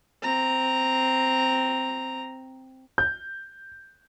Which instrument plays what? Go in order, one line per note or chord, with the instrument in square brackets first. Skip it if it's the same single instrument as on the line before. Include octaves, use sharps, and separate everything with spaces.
[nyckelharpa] C4 A#5
[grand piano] G6